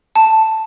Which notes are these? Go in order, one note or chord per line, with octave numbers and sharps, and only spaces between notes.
A5